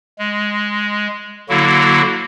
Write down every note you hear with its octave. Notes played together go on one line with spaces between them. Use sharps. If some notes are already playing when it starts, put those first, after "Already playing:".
G#3
D3 F#3 A#3 E4 F#4